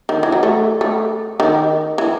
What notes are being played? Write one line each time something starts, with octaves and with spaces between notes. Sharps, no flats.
D#3
E3
F#3
A3
A3
D#3
E3